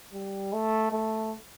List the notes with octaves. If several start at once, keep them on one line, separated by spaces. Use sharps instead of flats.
G3
A3
A3